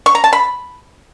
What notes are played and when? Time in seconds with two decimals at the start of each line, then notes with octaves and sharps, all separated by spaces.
0.06 C#6
0.15 A#5
0.24 A5
0.33 B5